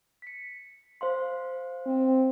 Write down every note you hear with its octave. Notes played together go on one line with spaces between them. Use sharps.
B6 C#7
C5 F5 C6
C4